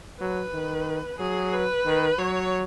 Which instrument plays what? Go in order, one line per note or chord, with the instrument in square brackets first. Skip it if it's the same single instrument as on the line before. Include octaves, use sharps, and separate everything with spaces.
[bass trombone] F#3 [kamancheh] B4
[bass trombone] D#3
[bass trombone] F#3 [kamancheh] G#4
[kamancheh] B4
[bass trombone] D#3
[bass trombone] F#3 [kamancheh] C#5